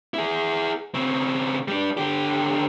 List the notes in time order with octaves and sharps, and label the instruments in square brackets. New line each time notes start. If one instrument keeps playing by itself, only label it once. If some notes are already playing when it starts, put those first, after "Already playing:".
[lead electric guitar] E4 G#4
C#3 C4
G3 D4
D3 G4